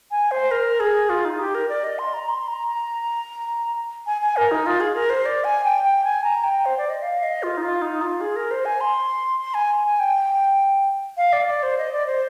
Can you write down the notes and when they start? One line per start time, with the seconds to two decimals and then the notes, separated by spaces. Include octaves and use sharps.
0.11 G#5
0.31 C5
0.51 A#4
0.80 G#4
1.10 F4
1.25 D#4
1.40 G4
1.55 A#4
1.69 D5
1.84 D#5
1.99 C6
2.14 A#5
2.29 C6
2.48 A#5
2.67 A#5
4.06 G#5
4.21 G#5
4.37 A#4
4.51 D#4
4.66 F4
4.80 G#4
4.95 A#4
5.10 C5
5.26 D5
5.44 G#5
5.64 G5
5.84 G5
6.04 G#5
6.24 A#5
6.44 G5
6.66 C5
6.78 D5
6.90 D#5
7.02 F5
7.23 D#5
7.43 F4
7.57 D#4
7.63 F4
7.82 D#4
8.01 F4
8.21 G#4
8.36 A#4
8.51 C5
8.65 G#5
8.81 C6
9.41 C6
9.54 G#5
9.85 G#5
10.00 G5
11.17 F5
11.33 D5
11.48 D5
11.63 C5
11.78 D#5
11.92 D5
12.07 C5